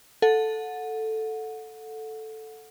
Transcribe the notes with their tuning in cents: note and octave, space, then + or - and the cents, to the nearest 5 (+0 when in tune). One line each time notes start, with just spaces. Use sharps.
A4 +0 F#5 -25